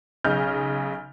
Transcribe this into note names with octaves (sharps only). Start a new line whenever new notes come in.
B1 C#3 D#5 F6 G6